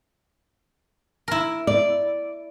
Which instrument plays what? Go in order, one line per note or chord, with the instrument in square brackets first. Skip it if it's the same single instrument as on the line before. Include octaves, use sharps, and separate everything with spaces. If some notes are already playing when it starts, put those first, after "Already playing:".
[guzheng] E4 A#4
[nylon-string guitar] D5